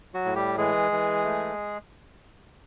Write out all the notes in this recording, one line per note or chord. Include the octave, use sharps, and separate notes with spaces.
F#3 F#4
A2
G3 G4
E3 G#3 G#4
E3
A3